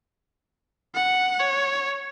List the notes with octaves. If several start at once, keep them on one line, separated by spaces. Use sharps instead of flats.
F#5
C#5